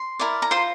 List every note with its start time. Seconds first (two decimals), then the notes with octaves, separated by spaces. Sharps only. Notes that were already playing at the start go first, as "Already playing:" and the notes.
Already playing: C6
0.19 E4 A#4 D5
0.42 A#5
0.51 F4 C5 C6